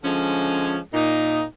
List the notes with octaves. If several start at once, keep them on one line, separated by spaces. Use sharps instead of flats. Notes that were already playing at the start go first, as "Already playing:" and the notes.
D3 F3 G#3 C#4
A#2 D#4